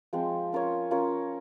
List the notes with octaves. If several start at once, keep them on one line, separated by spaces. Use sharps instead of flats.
F3 G#3 C4
C#4 F4 A#4 C#5
C#4 F4 A#4 C#5